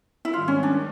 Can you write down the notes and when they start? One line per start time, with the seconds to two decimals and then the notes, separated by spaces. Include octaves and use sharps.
0.25 E4
0.34 G#2 D#3 G3 F4
0.48 C#4
0.63 D4